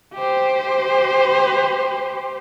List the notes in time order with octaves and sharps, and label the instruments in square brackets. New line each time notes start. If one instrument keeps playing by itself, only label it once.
[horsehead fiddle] G4 C5